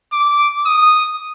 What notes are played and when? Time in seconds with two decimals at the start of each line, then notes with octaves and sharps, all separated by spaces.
0.13 D6
0.66 D#6